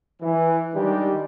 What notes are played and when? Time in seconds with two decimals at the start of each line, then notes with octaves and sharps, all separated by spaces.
0.22 E3
0.74 D#3 G3 G#3 D4 G4